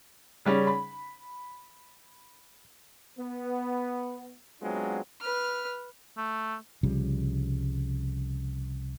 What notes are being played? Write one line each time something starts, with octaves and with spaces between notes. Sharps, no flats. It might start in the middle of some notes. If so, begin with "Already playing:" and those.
C#3 G3 C#4
B5
B3
F#3 G#3 B3 C4 D4 F4
B4 F6
A3
C2 C#3 F3 G3